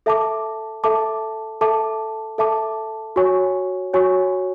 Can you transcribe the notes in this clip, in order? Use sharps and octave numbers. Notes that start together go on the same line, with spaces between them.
A4 E5 A5 D6
A4 E5 A5 D6
A4 E5 A5 D6
A4 E5 A5 D6
F#4 C#5 G#5 C#6
F#4 C#5 G#5 C#6